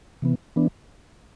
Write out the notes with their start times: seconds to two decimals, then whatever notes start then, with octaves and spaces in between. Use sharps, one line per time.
0.22 C3 E3 B3
0.56 E3 B3 D4